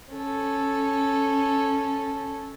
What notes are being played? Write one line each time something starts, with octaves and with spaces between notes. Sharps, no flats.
C#4 A4